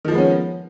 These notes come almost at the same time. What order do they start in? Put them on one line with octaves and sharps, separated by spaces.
D#3 F3 G#3 B3 C#4